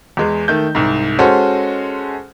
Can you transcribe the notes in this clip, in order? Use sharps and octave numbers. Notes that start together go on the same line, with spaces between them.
E2 G#3
D#3 A3 G6
C2 G#2
G#3 C#4 F#4 A4 C5